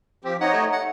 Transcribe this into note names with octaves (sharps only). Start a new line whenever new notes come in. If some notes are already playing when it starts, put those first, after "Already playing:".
F3 C4 G4
D#4 C#5 D#5 F#5
A3
A3 F#5